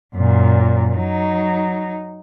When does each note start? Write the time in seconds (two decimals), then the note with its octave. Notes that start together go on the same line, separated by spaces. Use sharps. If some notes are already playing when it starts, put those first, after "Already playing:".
0.16 F#2 A#2
0.95 F#3 D#4